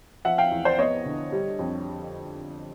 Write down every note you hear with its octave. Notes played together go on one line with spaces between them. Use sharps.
F3 E5 F#5
F5 G5
E2
C5 D5
B3 C#5 D#5
D3
G3
F2